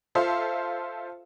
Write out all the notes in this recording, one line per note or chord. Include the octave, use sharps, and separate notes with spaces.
F4 A4 C5 E5 F5